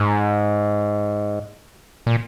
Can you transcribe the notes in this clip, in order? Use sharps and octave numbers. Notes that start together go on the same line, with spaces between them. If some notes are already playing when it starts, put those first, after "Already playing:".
Already playing: G#2
A#2